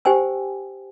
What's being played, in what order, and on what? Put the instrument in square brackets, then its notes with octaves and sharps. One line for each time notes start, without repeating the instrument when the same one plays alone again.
[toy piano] G4 C5 G5 G#5 E6